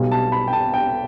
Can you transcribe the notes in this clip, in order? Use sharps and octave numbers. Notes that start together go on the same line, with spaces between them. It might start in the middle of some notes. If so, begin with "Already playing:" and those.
Already playing: B1 B2 G3
A5
B5
G5
A5
G5